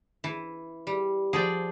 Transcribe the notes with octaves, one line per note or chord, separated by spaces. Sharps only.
E3
G3
F3 G#4 D5 G5